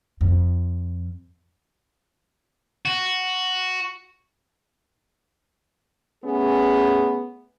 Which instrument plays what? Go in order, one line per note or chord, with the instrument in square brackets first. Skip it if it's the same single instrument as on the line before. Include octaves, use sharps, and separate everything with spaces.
[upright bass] F2
[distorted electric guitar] F#4
[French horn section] A3 B3 C#4 G#4